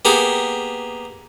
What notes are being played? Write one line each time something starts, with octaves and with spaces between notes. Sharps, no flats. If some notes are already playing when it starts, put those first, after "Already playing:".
A#3 B3 G4 G#4